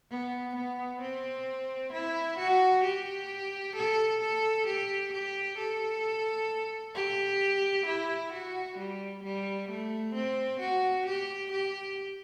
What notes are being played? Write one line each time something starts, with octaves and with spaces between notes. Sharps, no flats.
B3
B3
C4
E4
F#4
G4
A4
A4
G4
G4
A4
G4
E4
F#4
G3
G3
A3
C4
F#4
G4
G4